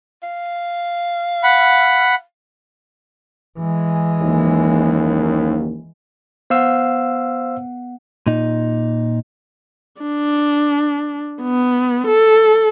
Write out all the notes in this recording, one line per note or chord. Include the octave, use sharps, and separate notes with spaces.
F5
F#5 B5
E3 G#3
F#1 D#2
B3 C5 F5 F#5 E6
A#2 D#4
D4
B3
A4